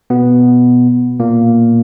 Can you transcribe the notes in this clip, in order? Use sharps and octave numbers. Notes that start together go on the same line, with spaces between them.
B2 B3
A#2 A#3